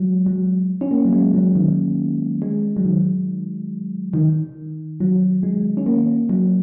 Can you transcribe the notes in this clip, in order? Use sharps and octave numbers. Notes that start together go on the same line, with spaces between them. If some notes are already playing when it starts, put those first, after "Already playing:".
Already playing: F#3 G#3
F#3
C#4
A#3
F#3
G#3
F#3
D#3
G#3
F#3
D#3
D#3
F#3
G#3
C#4
A#3
F#3